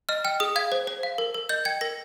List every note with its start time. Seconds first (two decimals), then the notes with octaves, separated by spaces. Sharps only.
0.09 D#5 F6
0.24 G5 F6
0.40 G#4 D#6
0.56 F5 G#6
0.72 C5
0.87 C5
1.03 F5
1.18 A#4
1.34 A#4
1.49 D#5 G6
1.65 G5 G#6
1.81 A#4 A#6